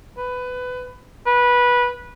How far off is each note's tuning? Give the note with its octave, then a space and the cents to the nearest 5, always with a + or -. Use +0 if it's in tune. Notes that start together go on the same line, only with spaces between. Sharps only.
B4 +20
B4 -15